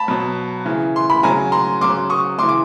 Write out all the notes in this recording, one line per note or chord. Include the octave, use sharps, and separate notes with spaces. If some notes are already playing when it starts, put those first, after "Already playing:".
Already playing: A5 B5
B2 F#3
C#3 E3
C6
B5
C#3 F#3 G#5 A#5
A#5 C6
C#3 F#3 C6 D6
C#6 D#6
C#3 E3 C6 D6
D6